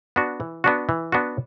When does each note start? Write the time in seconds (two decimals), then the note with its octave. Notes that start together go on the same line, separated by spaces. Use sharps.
0.16 B3 D4 F#4
0.40 E3
0.64 B3 D4 F#4
0.89 E3
1.12 B3 D4 F#4